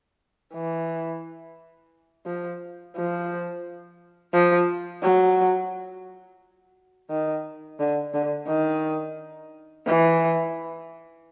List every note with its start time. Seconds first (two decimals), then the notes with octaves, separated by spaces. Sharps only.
0.54 E3
2.26 F3
2.96 F3
4.33 F3
5.03 F#3
7.10 D#3
7.79 D3
8.14 D3
8.48 D#3
9.87 E3